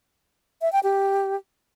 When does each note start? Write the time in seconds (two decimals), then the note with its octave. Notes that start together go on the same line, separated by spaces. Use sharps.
0.61 E5
0.72 G5
0.83 G4